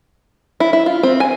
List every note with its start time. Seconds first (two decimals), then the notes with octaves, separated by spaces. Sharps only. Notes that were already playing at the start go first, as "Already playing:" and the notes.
0.60 E4
0.73 E4
0.86 F4
1.03 C4
1.20 G#5